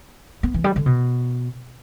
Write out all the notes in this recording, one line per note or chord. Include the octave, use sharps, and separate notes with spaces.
B3
E3
G3
D3
B2